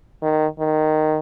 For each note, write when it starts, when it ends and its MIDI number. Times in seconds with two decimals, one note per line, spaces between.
0.22 0.46 51
0.59 1.19 51